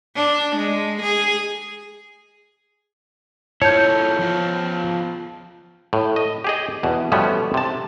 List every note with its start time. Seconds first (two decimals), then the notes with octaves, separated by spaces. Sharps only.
0.16 D4
0.55 G#3
1.02 G#4
3.62 E4 F4 A4 C#5 A5 G6
4.19 F3 B3 F4
5.93 A2
6.16 D#5
6.44 G4 G#4 D#5
6.83 E2 B2
7.12 B2 F3 G3 A3 B3 C#4
7.54 C3 A5